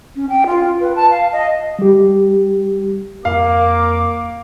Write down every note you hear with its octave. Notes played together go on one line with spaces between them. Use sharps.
C#4
G5
F4
B4
A5
F5
D#5
G3 G4
F2 A#3 F5 D6